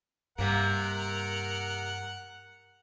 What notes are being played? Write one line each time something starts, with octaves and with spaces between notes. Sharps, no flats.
G2 C3 A#3 A#4 F#5